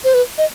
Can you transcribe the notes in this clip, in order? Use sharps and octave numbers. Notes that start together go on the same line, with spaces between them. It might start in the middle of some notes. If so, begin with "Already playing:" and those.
C5
B4
D#5